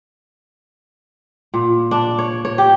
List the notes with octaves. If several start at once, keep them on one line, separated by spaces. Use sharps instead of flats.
A#2
D4
C#5
C#5
G4